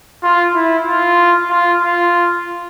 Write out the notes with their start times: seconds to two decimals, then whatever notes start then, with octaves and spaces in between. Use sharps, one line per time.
0.23 F4
0.55 E4
0.86 F4
1.50 F4
1.82 F4